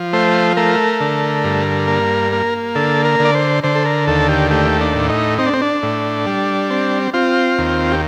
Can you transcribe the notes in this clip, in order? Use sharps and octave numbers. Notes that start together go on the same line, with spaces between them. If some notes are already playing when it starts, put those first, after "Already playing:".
Already playing: F3
A3 C5
A3 A#4
D3
G2
A#3
A#3
D3 A4
A#4
D3
D5
C5
D3 C5
A4
A#4
D#2 A4
G4
A3 G4
D4
A2
D#4
C4 D#4
D4
C4
D4
A2
G3
C4
C4 F4
D#2
G4